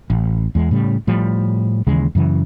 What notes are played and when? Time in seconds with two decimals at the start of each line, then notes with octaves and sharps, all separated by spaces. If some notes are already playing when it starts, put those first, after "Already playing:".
0.10 A1
0.55 E2 G#3
0.71 A2 C#3 G3
1.07 A2 F3 G3
1.87 D#2 C#3 E3 G#3
2.15 F#2 C#3 E3